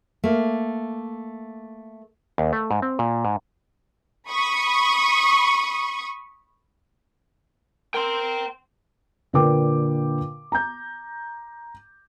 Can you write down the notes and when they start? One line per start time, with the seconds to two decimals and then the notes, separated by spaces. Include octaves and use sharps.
0.24 A3 A#3
2.38 D#2
2.53 A3
2.71 G#2
2.82 C4
2.99 A#2
3.25 G#2
4.29 B5 C#6 D#6
7.94 A#4 G5 C6
9.33 A#2 D3 A#4 B4 G5 D6
10.52 A#5 G6